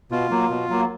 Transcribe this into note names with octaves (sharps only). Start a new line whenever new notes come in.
B2 F4
F#3 A#3
B2
F#3 A#3